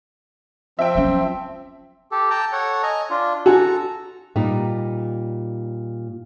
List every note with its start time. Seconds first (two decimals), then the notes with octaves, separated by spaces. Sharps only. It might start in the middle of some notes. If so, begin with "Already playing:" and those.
0.79 F3 C4 E5 G5
0.95 F#3 C#4
2.12 G4 A4
2.30 G5 A5 A#5
2.53 A4 C#5 F#5
2.83 D#5 G#5 A#5
3.10 D4 F4
3.46 F#4 A4 G#5 A#5
4.36 A#2 G3 D#4